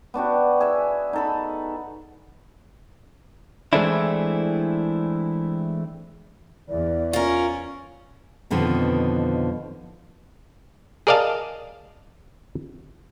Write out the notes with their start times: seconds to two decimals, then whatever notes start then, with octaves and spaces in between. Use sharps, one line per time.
0.14 B3 D4 F#4 G4
0.60 G#4 E5
1.13 D#4 A4 B5
3.73 E3 G#3 A3 C4 D4 E4
6.69 E2 D5
7.13 C#4 F4 A#4
8.50 F2 B2 D3 D#3 F3 B3
11.07 G#4 A#4 D5 D#5 F5 A5